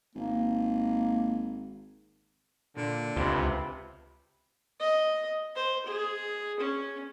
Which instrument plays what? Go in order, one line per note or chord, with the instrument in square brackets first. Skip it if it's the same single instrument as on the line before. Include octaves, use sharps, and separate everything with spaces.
[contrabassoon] G#1 [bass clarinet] A#3
[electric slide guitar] A#2 [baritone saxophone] D3
[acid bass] C#2 [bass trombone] C3 [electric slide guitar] F4 B4
[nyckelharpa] D#5
C5
G#4
C#4